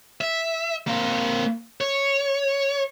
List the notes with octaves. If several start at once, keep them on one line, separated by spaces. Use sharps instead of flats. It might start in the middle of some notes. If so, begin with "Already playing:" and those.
E5
A#3 C4
C#5